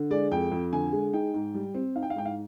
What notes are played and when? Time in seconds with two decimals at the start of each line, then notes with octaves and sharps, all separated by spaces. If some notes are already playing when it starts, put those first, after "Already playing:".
Already playing: D3
0.11 G#3 D5
0.32 F2 G5
0.52 F2
0.73 D3 G#5
0.93 G#3
1.13 D#4 G5
1.34 G#2
1.54 G3
1.75 C4
1.96 D#4 F5
2.03 G5
2.10 F5
2.16 G#2 G5
2.26 F5